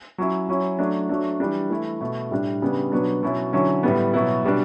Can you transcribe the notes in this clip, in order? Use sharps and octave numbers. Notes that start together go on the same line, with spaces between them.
F#3 C#4 E4
F#3 C#4 E4
F#3 A3 D4
F#3 A3 D4
E3 G3 D4
E3 A3 E4
B2 A3 E4
A2 G3 D4
C#3 G3 B3 D4
B2 F#3 B3 D4
B2 F#3 C#4 E4
D3 F#3 C#4 E4
A2 G3 B3
B2 F#3 B3 E4
B2 G3 D4